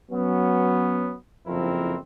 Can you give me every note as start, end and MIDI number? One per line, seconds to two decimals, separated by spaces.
0.12 1.14 54
0.12 1.14 59
0.12 1.14 61
1.47 1.97 30
1.47 1.97 41
1.47 1.97 53
1.47 1.97 60
1.47 1.97 64
1.47 1.97 70